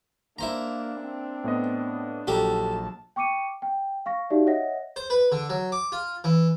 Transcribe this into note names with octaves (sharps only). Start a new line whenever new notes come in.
A#3 D4 E4 C5 A#5
C4
A2 B3 D#5
A#1 F#3 F#4 G4 A4 A5 A#5
G5 C#6 D6 C#7 D#7
G5
F5 C#6 A#6
D#4 F#4 G4 D5 E5 F5
C#5 D#5 E5 F#5 A#6
C5
B4
D3
F#3
D6
F4
E3